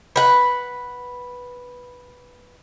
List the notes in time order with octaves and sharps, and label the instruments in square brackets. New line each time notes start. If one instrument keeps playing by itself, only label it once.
[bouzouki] B4 F#5